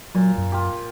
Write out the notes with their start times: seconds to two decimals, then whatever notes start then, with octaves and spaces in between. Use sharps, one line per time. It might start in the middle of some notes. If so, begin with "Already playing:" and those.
0.15 A#2 F#3
0.38 F#2
0.52 F4 G4